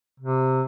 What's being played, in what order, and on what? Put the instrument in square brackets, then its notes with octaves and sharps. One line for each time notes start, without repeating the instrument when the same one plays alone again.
[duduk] C3